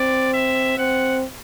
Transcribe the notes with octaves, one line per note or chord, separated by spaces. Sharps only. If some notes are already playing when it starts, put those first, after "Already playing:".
Already playing: C4 D5
E5
C4 F#5